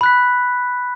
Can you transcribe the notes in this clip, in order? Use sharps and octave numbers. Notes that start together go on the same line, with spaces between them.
B5 F#6 B6